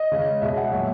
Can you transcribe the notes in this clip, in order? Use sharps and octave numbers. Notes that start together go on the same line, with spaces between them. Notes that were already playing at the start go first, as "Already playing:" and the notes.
Already playing: D#5
C#3 G#3
B2 G#3 E5
F#5
A#2 F#3 E5